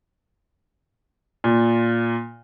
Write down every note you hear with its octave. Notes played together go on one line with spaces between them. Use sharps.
A#2